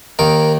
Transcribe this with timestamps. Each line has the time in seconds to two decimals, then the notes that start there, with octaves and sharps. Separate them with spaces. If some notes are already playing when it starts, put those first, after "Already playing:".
0.19 D#2 D#3 A#4